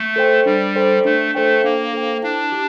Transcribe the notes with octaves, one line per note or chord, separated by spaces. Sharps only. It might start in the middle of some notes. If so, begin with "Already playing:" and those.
Already playing: A3
A4 C5 G5
G3 D4
A4 C5 G5
A3 D4
A3 A4 C5 G5
A#3 D4
A4 C5 G5
D4 E4
G4